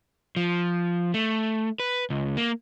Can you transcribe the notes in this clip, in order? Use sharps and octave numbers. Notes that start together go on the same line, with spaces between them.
F3
A3
B4
C#2
A#3